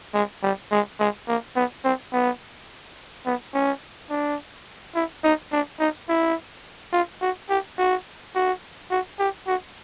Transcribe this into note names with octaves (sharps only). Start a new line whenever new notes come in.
G#3
G3
G#3
G#3
A#3
B3
C4
B3
B3
C#4
D4
E4
D#4
D4
D#4
E4
F4
F#4
G4
F#4
F#4
F#4
G4
F#4